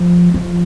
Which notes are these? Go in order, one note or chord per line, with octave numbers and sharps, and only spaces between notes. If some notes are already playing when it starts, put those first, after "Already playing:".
Already playing: F3
F3